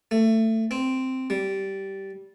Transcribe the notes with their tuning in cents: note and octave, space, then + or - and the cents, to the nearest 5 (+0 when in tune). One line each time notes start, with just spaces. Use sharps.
A3 +20
C4 -5
G3 -15